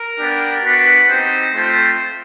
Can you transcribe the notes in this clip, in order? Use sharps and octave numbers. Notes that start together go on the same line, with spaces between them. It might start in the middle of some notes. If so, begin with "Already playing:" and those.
Already playing: A#4
B3 D4 G4
B3 D4 F#4 B4
C4 D#4 G4 C5
A3 C4 F4 C5